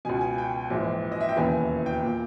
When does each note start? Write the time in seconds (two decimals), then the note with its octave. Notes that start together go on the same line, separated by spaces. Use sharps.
0.05 C#2 B2 G#5
0.21 G#5
0.38 G5
0.70 A#1 G#2 E3
1.12 D#5
1.20 E5
1.29 G5
1.37 E1 D#2 C#3 E3 G#5
1.86 G5
2.03 A#2